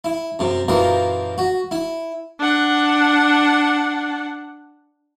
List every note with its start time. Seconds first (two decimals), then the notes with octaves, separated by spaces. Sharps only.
0.04 E4
0.39 F#2 C3
0.68 F#2 A#2 E3 F3 A#4
1.38 F#4
1.71 E4
2.40 D4 F#5